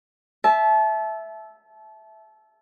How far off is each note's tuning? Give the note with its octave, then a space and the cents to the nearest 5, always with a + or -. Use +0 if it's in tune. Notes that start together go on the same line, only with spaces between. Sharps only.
E5 +0 A5 -30